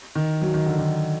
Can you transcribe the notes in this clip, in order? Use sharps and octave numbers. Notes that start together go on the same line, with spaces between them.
D#3
F#3
D#3
D3
D#3